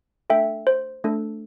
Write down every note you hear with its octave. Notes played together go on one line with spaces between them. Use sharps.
A3 D4 A4 E5 G5
C5
A3 D4 A4